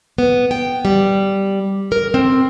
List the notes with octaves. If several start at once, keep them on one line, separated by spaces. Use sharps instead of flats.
B3
G5
G3
A#4
C4